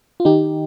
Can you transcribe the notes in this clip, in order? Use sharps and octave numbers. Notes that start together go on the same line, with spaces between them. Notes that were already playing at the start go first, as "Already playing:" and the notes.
F4
D#3 D#4 G4